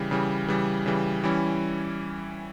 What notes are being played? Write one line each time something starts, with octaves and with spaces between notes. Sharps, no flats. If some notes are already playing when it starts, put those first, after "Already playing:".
Already playing: C#3 E3 G3
C#3 E3 G3
C#3 E3 G3
C#3 E3 G3
E3 G3 C#4 E4